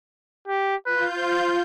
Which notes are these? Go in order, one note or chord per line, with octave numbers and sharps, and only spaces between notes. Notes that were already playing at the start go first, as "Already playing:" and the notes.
G4
F4 B4 G6
C5